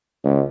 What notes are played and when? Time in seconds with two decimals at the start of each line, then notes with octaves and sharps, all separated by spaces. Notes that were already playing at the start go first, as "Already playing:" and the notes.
0.25 C#2